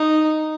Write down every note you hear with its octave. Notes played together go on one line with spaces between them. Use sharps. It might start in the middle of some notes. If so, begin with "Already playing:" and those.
Already playing: D#4